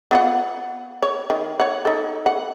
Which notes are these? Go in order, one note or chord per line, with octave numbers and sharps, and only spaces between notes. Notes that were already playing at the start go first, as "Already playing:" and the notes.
B3 F4 F#5
C#5
D#3
C#5 F#5
D#4 A4
F#5